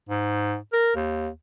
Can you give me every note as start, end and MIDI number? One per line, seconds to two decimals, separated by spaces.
0.09 0.56 44
0.73 0.92 70
0.96 1.29 39